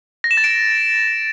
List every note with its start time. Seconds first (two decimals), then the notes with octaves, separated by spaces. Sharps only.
0.24 A#6
0.31 E7
0.37 A6
0.44 D7